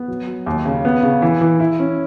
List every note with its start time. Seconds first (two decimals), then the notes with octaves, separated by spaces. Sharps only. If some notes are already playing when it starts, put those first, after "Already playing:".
Already playing: B3
0.08 F#3
0.27 F#3
0.46 D#2
0.65 C#3
0.85 B3
1.03 C#3
1.22 E3
1.41 E3
1.60 E4
1.79 C#4